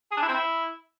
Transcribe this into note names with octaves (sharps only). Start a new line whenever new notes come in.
G#4
D4
E4
C4
E4